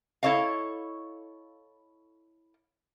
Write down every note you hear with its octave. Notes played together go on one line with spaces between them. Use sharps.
E4 A4 C#5 D#5 F5